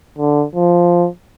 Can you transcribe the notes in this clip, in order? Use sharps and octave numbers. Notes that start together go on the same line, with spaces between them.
D3
F3